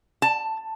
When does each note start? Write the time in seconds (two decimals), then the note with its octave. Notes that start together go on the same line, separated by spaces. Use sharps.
0.22 A5